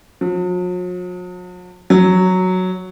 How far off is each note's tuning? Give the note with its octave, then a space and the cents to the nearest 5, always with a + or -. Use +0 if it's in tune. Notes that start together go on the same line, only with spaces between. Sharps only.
F#3 -45
F#3 +0